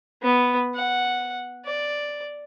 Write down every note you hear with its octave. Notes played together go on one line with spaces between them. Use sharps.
B3
F#5
D5